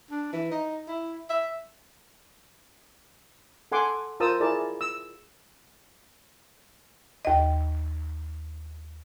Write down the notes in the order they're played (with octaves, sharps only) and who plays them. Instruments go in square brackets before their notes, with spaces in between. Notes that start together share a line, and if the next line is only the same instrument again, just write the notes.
[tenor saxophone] D4
E3
D#4
E4
E5
[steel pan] A4 F#5 G#5 C6 D6
F4 A#4 C5 A5 D#6 E6
E4 G#4 A#4 D5 A5
E6
[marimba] D#2 D#5